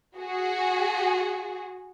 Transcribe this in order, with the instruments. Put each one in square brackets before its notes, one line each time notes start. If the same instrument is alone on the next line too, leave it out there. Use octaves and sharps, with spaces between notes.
[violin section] F#4 G#4